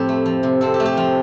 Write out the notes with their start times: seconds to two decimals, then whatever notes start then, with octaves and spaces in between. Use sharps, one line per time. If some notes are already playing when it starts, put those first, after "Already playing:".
Already playing: F2 A2 C4 G4 A4
0.09 A3
0.26 F3
0.43 C3
0.61 C4 A4
0.74 G4
0.80 A3
0.86 G4
0.97 F3 F4